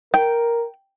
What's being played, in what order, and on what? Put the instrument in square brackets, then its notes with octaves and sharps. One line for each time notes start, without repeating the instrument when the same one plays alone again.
[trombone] A#4 [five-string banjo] G5